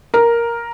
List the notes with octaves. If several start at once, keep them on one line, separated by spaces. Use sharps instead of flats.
A#4